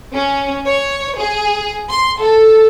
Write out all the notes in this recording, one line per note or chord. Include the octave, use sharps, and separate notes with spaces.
C#4
C#5
G#4
C6
A4